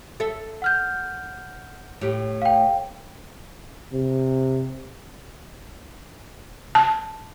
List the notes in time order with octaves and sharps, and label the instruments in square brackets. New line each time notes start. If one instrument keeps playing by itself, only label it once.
[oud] A4 E5
[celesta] F#5 F6 G6
[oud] A2 G4
[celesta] F5 G5
[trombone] C3
[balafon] A5